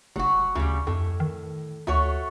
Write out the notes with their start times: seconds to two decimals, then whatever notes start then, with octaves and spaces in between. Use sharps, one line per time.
0.16 F1 F#3 F#4
0.55 D2 C#3 G3
0.87 F2 A2
1.20 D#3
1.87 D2 A3 F#4 C#5